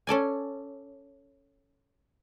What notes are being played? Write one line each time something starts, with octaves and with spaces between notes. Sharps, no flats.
C#4 A4 D5 G#5